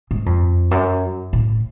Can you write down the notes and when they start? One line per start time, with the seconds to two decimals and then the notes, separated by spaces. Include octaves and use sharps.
0.11 G#2
0.26 F2
0.71 F#2
1.33 A2